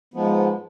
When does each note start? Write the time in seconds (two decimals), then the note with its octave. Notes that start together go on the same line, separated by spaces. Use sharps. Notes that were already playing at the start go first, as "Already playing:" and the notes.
0.14 G#2 F3 G#3 B3